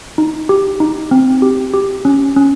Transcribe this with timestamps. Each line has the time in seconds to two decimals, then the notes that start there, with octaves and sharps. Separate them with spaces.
0.18 D#4
0.49 G4
0.80 D#4
1.11 C4
1.42 G4
1.74 G4
2.05 C#4
2.36 C#4